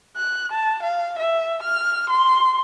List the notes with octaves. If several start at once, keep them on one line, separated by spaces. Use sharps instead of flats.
F#6
A5
F5
E5
F6
C6